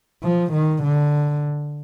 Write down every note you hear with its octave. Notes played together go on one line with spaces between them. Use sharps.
F3
D#3
D3